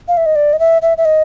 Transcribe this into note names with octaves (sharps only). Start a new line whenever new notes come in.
F5
E5
D#5
D5
D#5
E5
E5
E5
D#5